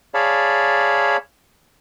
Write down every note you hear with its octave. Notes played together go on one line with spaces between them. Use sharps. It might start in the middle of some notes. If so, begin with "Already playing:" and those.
G#4 C#5 D5 F5 A5 B5